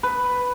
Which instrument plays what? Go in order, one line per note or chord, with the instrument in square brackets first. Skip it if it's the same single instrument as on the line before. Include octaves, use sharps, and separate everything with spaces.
[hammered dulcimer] B4